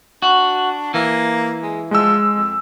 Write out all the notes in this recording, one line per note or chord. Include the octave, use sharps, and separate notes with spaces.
D4 F#4
E3 A#3
G#3
F3 G#3 E6
F2